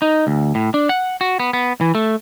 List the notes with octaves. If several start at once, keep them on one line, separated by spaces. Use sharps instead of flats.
D#4
D2
A2
D4
F#5
F#4
B3
B3
E3
A3